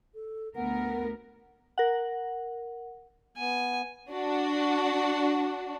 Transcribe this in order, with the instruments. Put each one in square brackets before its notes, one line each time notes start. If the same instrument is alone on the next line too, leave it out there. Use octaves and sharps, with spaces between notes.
[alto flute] A4
[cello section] D2 B3 A#4 [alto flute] F#5
[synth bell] A#4 F#5
[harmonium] B3 [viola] G#5
[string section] D4 F#4